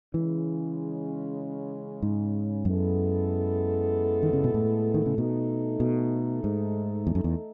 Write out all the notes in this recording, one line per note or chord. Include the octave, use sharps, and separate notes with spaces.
C#3 E3 G#3 C#4
G#2
F#2 G#3 B3 E4 A4
D#3
C#3
B2
A2
D#3
C#3
B2 A3 D#4 A4
B2
G#2
E2
F#2
E2